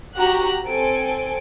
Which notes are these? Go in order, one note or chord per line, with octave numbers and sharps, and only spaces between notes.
F#4 G4 A#5 F#6
C4 A4 G#5 D7